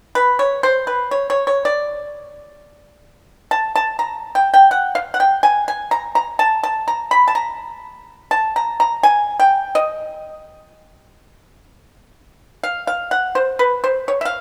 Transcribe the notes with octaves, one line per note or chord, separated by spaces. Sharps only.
B4
C#5
C5
B4
C#5
C#5
C#5
D5
A5
A5
A#5
G5
G5
F#5
F5
F#5
G5
G#5
G#5
A#5
A#5
A5
A5
A#5
B5
A5
A#5
A5
A#5
A#5
G#5
G5
D#5
F5
F5
F#5
C5
B4
C5
C#5
E5
F5